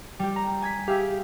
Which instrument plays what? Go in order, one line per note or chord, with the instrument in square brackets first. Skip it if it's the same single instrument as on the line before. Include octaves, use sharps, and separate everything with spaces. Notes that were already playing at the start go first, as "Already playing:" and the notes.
[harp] G3 G4
A#5
G#5 G#6 B6
[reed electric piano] G4 [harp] G#4 E5 F5